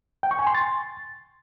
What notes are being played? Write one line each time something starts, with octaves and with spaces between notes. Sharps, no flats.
G5
C#6
G#5
C6
A6